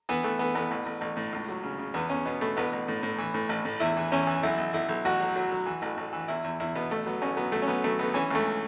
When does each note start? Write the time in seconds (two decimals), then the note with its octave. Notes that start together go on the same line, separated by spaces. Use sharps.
0.09 E3 B3
0.24 E3 A3
0.39 E3 B3
0.55 A1 B3
0.71 A1
0.86 A1
1.01 A1
1.17 A2
1.33 C#2
1.49 F#3
1.64 C#3
1.79 C#3
1.94 E2 B3
2.10 E2 C#4
2.25 B2 B3
2.41 B2 A3
2.57 A1 B3
2.73 A1
2.88 A2
3.03 A2
3.18 E3
3.34 A2
3.49 A1
3.65 A2
3.80 E2 E4
3.97 E3
4.12 E2 C#4
4.27 E3
4.43 B1 E4
4.58 B1
4.73 B1 E4
4.89 B1
5.05 A1 F#4
5.20 F#3
5.36 F#3
5.52 F#3
5.66 E3
5.82 A1
5.97 A1
6.13 E3
6.28 E2 E4
6.44 E2
6.60 E2 E4
6.75 B2 B3
6.91 A1 A3
7.06 F#3 B3
7.22 A1 C#4
7.37 F#3 B3
7.52 F#3 A3
7.62 C#4
7.68 B1 B3
7.84 F#3 A3
7.99 B1 B3
8.14 E3 C#4
8.30 C#2 A3